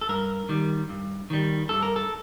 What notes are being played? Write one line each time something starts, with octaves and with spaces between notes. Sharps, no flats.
A4
G2 A#4
D#3 G3
G2
D#3 G3
G2 A4
A#4
A4